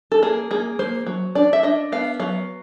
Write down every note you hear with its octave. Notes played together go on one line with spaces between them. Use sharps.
A4
A#3 G#4
A#3 G#4
A#3 C5
F#3
D4 D5
E5
D4 D#5
B3 F5
F#3 F5